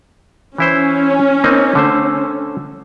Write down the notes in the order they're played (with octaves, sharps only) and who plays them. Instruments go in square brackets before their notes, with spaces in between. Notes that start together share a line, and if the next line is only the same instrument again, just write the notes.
[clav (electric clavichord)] E3 E4 C5 [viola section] C#4
[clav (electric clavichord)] A#3 C4 D#4
D3 A3 C5